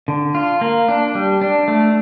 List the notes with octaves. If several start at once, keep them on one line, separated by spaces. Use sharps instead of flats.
D3
F4
A#3
D4
G3
D4
A3